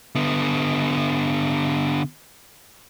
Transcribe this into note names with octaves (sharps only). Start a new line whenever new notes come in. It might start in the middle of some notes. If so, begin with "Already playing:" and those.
D3 B3